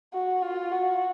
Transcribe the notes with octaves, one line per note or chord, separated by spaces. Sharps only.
F#4
F4
F#4